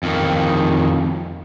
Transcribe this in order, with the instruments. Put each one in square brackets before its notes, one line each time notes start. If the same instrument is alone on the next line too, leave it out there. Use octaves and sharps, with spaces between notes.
[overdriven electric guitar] F2 D#3